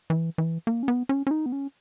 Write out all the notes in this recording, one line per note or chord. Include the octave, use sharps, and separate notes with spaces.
E3
E3
A#3
C#4
B3
C#4
C#4
D#4
B3
C#4